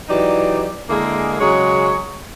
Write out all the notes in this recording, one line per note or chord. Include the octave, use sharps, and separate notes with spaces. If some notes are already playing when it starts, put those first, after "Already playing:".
E3 F#3 D#4 G4 D5
D3 G#3 A#3 E4 G#4 A#4
C#3 F#3 G#3 G#4 C#5